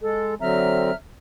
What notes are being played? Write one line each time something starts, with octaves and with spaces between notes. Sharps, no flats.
G#3 A4
D3 F#3 C4 E5 A#5 F6